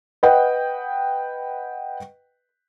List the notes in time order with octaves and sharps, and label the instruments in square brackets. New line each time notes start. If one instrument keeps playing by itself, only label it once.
[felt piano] B4 D#5 F#5 G5